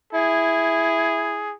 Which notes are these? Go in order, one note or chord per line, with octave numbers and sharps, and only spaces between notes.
E4 G#4